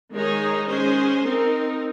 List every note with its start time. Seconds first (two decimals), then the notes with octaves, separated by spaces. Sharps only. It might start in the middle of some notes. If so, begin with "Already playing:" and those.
0.13 D#3 G#3 D#4 G#4 C#5
0.68 G#3 C#4 G#4 C5
1.24 C4 D#4 A#4